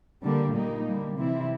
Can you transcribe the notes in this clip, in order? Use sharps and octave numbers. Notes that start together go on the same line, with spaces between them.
D3 G3 A#3 D4
A#2 G3 A#3 D#4
D3 G3 A#3
C3 E3 G3 C4 E4